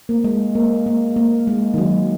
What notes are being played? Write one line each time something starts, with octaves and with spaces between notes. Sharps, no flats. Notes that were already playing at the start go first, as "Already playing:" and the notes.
A#3
G#3
A#3
A#3
A#3
G#3
D#3
F#3